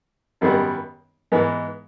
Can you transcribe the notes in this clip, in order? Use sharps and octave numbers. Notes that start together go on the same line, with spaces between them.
G#1 F#2 D#3 G3 B3
G#2 E3 G#3 B3